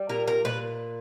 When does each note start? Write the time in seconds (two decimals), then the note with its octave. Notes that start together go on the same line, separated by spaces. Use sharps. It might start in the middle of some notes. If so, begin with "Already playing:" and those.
Already playing: G3
0.09 A#2 A#4
0.28 A#4
0.45 A#2 B4